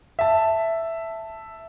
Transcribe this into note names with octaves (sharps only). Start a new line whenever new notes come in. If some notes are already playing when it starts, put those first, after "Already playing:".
E5 A5